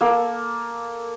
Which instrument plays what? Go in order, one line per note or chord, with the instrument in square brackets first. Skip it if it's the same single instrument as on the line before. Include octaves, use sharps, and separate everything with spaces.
[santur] A#3 A4 E6